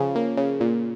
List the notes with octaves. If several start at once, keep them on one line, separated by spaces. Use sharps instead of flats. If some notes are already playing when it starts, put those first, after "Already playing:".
Already playing: C#3 F3
A#3
C#3
A#2